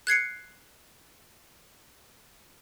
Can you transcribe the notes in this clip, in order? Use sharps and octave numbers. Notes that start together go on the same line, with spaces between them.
F#6 G#6 C7 C#7